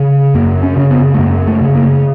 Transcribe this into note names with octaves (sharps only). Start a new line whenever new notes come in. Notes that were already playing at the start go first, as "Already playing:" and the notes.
Already playing: C#3
F#2 A#3
C#4
C#3
B3
A3
F#2 A#3
A3
C#3
A#3